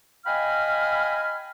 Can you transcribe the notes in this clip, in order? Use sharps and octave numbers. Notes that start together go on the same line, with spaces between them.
D#5 F5 G5 G#5 B5 F6